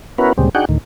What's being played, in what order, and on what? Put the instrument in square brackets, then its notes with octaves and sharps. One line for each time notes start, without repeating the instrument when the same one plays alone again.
[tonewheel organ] B3 C#4 E4 F#4 A#4 B4
D2 A#2 C#3 G3 G#3 C4
D4 D#4 F#4 G#4 F#5 G5
D2 A2 D#3